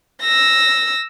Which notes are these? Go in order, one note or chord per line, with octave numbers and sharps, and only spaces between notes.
E6 A#6